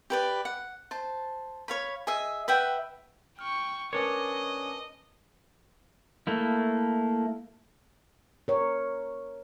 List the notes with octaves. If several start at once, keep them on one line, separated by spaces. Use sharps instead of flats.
G4 B4 D5
F#5
C5 A5
C#5 F5 B5
G#4 D#5 E5
B4 E5 F#5 G5
G5 C#6 F6
C#4 D4 A#4 B4 C#5 D#5 C#6
A3 A#3 E4
A#4 C#5